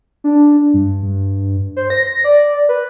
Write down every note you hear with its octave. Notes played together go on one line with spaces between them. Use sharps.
D4
G2
G2
C5
A#6
D5
B4